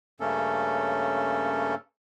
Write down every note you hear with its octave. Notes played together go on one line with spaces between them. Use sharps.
G2 C#3 A3 A#3 C#4 A4